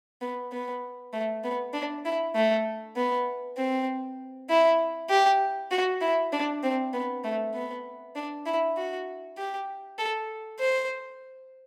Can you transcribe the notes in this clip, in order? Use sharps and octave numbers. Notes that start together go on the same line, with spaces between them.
B3
B3
A3
B3
D4
E4
A3
B3
C4
E4
G4
F#4
E4
D4
C4
B3
A3
B3
D4
E4
F#4
G4
A4
C5